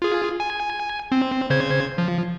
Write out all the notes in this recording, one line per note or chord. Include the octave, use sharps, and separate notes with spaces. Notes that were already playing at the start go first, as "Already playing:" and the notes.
F4 G#4
G#5
C4
C#3 C5 G#6
F3